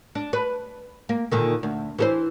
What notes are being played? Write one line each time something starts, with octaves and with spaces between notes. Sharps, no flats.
D4
B4
A#3
A#2 D3 D#3
D2
E3 A4 C5